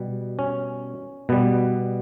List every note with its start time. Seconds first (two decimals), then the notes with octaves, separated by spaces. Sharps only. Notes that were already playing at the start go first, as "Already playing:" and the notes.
Already playing: B2 G3
0.39 C#4
1.29 B2 G3 B3